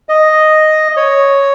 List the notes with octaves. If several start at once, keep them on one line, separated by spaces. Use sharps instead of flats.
D#5
C#5